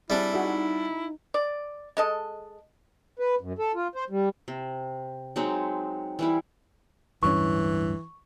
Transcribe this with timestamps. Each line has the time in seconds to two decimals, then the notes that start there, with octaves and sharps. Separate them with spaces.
0.10 G3 C4 D4 E4 G#4 E5
0.33 D#4 F#4 G#4 E5
1.34 D5
1.97 G#3 A4 D#5
3.19 B4
3.41 F#2
3.59 A4
3.74 F4
3.95 C5
4.10 G3
4.48 C3
5.36 F#3 G#3 C4 D#4
6.19 E3 G3 E4
7.23 D1 G2 E3 C#4 C#6